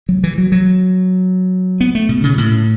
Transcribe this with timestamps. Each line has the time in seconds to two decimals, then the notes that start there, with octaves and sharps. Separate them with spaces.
0.09 F#3
0.24 E3
0.38 F#3
0.52 F#3
1.81 B3
1.95 A3
2.09 B2
2.23 C#3
2.38 A2